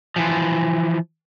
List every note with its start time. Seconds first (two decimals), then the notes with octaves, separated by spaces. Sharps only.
0.16 E3 F3